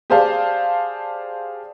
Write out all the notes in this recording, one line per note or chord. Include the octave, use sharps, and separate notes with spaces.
G4 G#4 C5 D5 F5 A5